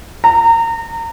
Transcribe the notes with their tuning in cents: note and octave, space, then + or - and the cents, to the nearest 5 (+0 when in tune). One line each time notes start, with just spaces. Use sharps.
A#5 -30